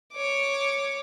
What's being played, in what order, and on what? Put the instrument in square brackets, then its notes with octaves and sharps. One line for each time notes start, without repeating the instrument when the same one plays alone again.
[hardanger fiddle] C#5 D6